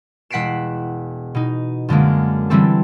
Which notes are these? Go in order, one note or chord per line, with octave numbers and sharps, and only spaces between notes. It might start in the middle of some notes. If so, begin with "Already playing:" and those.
E1 F#5 B6 C7 D7 E7
B2 D#4
F#2 D3 G#3 A#3
D3 E3 G3 C4 A4